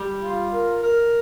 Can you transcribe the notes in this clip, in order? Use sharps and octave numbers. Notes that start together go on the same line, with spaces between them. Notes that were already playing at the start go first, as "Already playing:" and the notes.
Already playing: G3
F4
A#4
A#4